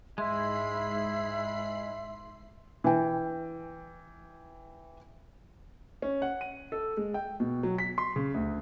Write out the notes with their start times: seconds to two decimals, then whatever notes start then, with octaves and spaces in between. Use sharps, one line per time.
0.18 G#2 G#3 E4 E5 B5 C6 C7
2.84 E3 G5
6.02 C#4
6.22 F#5
6.41 D#7
6.72 A4
6.97 G#3
7.14 G5
7.40 B2
7.63 F#3
7.78 B6
7.98 C6
8.16 C#3
8.34 D2